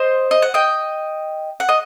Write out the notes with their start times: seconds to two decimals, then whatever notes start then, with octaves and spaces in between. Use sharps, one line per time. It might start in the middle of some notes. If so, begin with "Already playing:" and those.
Already playing: C5 D#5
0.31 D#5
0.42 F#5
0.54 D#5 G5
1.60 F#5
1.69 D#5